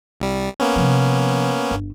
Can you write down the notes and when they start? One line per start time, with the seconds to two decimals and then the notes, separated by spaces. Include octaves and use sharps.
0.20 C2 G3
0.60 A#3 B3 C#4
0.76 C3 F3
1.71 G1